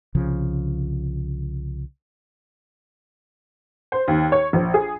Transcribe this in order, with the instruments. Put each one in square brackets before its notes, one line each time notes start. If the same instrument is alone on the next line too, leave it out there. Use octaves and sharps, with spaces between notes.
[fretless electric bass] C2 C#3 F3
[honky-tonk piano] C5
D#2
C#5
A#1
G#4